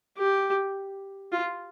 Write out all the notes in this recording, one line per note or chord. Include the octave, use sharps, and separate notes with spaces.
G4
F4